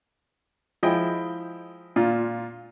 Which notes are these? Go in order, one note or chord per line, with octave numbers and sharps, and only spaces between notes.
F3 G#3 E4 D#5 G5 B5
A#2 F4